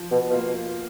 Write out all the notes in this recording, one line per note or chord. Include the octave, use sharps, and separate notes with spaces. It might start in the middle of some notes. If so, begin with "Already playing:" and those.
Already playing: F3
B2
B2 A#3 F4